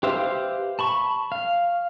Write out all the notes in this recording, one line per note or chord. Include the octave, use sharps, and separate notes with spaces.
G4 B4 C5 E5 F5
A5 B5 C#6
F5